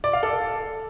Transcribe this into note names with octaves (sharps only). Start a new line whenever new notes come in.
D5
F5
A4